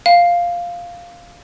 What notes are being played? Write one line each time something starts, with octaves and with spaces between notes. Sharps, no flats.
F5